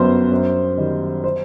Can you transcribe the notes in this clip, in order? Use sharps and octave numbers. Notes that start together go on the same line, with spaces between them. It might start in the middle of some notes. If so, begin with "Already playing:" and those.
Already playing: G1 F#2 F#3 B3 C5
F#2
D#3 G3
C5